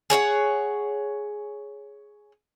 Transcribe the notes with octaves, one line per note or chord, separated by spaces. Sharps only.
G#4 C#5 E5 F#5